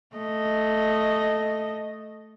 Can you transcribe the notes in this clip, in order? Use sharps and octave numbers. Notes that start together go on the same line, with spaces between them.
A3 D#5